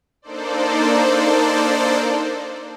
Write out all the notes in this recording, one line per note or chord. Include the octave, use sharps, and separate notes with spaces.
A#3 D4 D#4 A4 C5 D5